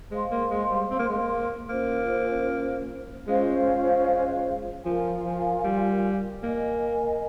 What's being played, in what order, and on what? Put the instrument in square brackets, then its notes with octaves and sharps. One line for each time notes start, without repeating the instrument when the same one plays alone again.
[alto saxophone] G#3 [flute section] C5 F5 C6
[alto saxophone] A#3
G#3
G3
C4
A#3
G#3
A#3
[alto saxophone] A#3 [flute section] C#4 F4 C5
[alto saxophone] G#3 [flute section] C#4 F4 C5 F5
[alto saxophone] G#3
[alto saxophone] F3 [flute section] F4 A#4 F5 G#5
[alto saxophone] F3
G3
[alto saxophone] A#3 [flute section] A#4 D#5 G#5